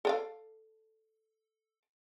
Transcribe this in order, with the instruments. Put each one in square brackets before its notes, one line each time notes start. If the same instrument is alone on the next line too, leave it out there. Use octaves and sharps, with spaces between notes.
[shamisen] A4 D5 F5